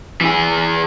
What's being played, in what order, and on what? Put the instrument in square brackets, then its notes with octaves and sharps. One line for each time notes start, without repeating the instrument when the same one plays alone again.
[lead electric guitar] E3 G#4